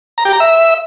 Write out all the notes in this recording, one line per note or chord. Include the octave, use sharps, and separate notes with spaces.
A#5
G4
A#5
E5